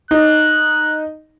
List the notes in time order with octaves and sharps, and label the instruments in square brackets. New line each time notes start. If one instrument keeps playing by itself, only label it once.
[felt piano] D#4 [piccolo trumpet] F#6